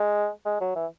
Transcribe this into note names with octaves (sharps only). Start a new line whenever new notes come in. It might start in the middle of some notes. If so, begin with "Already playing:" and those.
Already playing: G#3
G#3
F#3
E3